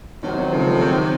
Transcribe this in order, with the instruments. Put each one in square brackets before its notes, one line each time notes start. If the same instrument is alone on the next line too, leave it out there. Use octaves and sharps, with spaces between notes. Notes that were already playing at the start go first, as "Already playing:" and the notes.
[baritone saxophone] C3 [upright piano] D#3 F#3
[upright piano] D#3 F#3
C#3 F3
F3 A3
D#3 F#3